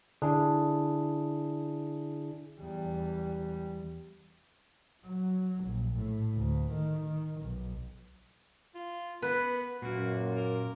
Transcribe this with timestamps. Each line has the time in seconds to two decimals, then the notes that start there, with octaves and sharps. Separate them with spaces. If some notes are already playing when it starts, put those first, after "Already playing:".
0.22 D3 D4 E4 G#4
2.60 E2 G3
5.06 F#3
5.64 A#1
5.95 A2
6.35 D2
6.71 D#3
7.05 D#3
7.41 B1
8.75 F4
9.22 B3 B4
9.82 F#2 A#2 A#3 F#4
10.37 A#4